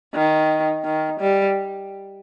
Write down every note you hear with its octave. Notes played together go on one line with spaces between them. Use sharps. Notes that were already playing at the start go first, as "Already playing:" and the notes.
D#3
D#3
G3